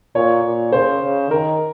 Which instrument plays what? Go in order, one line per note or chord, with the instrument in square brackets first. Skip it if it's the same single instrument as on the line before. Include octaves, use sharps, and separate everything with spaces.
[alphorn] A#2 [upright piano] C#5
[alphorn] A#2
[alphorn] C#3 [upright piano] C5
[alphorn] C#3
[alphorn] D#3 [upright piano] A#4